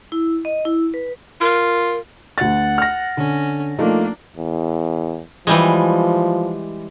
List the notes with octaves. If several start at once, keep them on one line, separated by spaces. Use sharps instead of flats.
E4
D#5
E4
B4
F4 A#4
D2 F#5 A6
F6 A#6
D3 C#4
F3 A3 A#3 D4 D#4
E2
E3 F3 G3 G#3